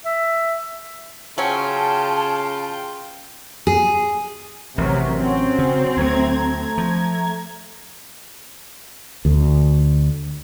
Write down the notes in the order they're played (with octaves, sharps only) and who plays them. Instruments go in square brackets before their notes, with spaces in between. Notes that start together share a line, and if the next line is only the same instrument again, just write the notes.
[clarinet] E5
[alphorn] C#3 [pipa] F#3 C#4 [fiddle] F4 G5 [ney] A5
[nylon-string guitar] G#4
[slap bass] A1 [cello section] C3 F#3 [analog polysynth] A#4
[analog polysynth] F#3 C#4 [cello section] C4
[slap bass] C#3
[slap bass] D2 F#3 [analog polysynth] A3 A#5 G#6
[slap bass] F3
[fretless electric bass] D2